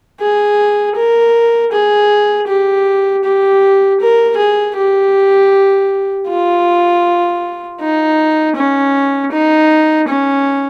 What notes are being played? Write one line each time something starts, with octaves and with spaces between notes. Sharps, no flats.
G#4
A#4
G#4
G4
G4
A#4
G#4
G4
F4
D#4
C#4
D#4
C#4